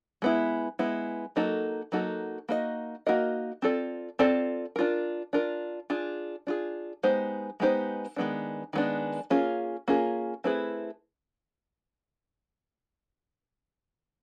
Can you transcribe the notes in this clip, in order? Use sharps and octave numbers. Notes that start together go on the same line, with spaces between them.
G#3 B3 E4
G#3 B3 E4
F#3 A#3 D#4 F#4 A4
F#3 A#3 D#4 F#4 A4
A#3 D#4 F#4 A#4 D#5
A#3 D#4 F#4 A#4 D#5
C4 F4 A4 D5
C4 F4 A4 D5
D4 F4 A#4
D4 F4 A#4
D4 F4 G#4
D4 F4 G#4
G#3 B3 D#4 G4 C5
G#3 B3 D#4 G4 C5
D#3 G#3 B3 D4
D#3 G#3 B3 D4
A#3 C#4 F4 G#4
A#3 C#4 F4 G#4
A3 C4 E4 G#4 B4